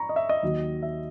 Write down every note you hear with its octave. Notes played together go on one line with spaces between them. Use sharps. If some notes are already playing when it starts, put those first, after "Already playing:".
Already playing: A#5 B5 C#6
D#5
E5
D#5
D#2 D#3 F#3
E5